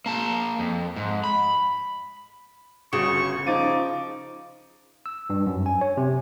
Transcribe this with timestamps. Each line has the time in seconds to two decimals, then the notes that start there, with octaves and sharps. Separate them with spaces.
0.06 A#3 A5
0.59 F2
0.96 G#2
1.24 B5
2.93 G1 C#3 F#4 C#6 E7
3.47 F3 D#4 D6 A6 D#7
5.06 E6
5.30 G2
5.46 F#2
5.66 G#5
5.81 C#5
5.97 C3